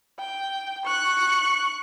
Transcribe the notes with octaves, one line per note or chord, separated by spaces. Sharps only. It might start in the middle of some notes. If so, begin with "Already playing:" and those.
G5
C#6 F#6